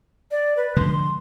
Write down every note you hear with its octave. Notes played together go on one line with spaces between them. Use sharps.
D5
B4
D3 F3 G#3 C6